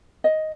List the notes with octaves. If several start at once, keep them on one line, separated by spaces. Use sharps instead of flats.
D#5